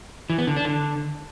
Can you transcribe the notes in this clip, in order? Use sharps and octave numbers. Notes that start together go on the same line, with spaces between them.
E3
B3
D3
D4
D3